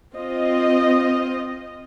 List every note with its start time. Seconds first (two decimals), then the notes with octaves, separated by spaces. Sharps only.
0.15 C4 F4 D#5